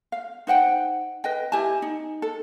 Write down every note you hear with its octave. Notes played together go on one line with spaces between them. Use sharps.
F5
D#4 C5 F#5 G5
B4 D#5 G5
E4 G4 G#5 A5
D#4
A4